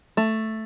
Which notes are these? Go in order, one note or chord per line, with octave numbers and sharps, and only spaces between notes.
A3